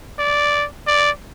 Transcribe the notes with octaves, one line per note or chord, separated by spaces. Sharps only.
D5
D5